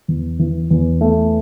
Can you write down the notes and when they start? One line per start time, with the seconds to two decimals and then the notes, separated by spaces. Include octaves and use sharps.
0.08 E2
0.39 E3
0.71 E2
1.01 A3